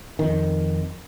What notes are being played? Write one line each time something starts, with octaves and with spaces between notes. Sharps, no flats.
F2 D#3